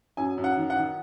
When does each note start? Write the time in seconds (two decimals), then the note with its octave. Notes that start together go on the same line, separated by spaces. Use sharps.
0.17 F#2 G#5
0.38 F#2
0.44 F#5
0.57 D#3
0.70 F#5
0.76 D#3